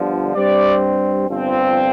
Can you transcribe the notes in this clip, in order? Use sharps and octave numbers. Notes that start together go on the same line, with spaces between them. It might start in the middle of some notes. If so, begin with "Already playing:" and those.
Already playing: G1 G2 D3 F3
G2 G3 C4 D5
G1 G2 F3 C4